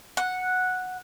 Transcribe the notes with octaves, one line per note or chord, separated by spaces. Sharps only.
F#5